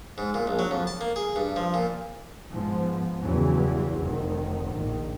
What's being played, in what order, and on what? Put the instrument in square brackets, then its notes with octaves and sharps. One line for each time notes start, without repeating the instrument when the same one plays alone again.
[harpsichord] G#2
A#2
A#1
F#3
F2
A5
A#3
G#4
G2
F3
A#2
[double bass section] G#2 F3 B3
E2 G2 C#3 E3 F#3 G3
F1 D#3
A#1 D#3